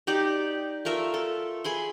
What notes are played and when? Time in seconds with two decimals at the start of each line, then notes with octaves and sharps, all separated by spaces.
0.07 D#4 G4 D5
0.85 A3 F4 A#4 E5
1.14 A4
1.64 G#4 B5 C6